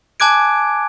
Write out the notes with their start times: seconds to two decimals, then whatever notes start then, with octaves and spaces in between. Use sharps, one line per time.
0.20 G#5 A5 D6 F#6 G#6 D7